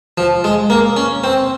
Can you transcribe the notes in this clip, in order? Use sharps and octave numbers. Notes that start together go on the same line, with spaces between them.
F3
G#3
A#3
C#4
C4